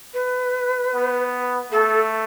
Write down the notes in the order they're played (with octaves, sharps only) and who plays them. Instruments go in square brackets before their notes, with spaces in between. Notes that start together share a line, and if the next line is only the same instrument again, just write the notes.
[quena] B4
[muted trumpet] B3
[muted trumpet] A3 [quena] A4